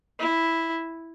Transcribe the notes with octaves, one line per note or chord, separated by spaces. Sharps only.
E4